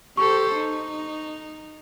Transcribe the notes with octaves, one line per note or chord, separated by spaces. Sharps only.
G4 A4 C5 C#6
D#4